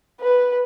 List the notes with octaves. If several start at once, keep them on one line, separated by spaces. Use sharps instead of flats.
B4